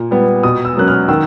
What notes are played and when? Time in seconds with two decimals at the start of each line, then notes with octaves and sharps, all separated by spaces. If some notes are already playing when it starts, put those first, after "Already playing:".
Already playing: A#2
0.11 G3 B3
0.43 B2 D#6
0.65 E6
0.77 F#3 A#3 C#4 F#6
0.88 F6
1.08 D#3 E6